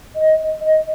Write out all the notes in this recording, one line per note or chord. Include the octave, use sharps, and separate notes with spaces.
D#5
D#5